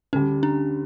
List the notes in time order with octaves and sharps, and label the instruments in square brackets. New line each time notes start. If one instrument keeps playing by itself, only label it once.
[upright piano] D2 D3 G3 [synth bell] C#4
[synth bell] D4